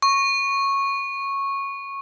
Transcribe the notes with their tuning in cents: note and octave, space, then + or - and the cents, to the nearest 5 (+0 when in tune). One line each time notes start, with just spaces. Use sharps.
C#6 -10